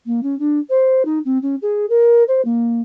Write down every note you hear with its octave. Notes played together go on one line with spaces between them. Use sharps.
A#3
C#4
D4
C5
D#4
C4
C#4
G#4
A#4
C5
A#3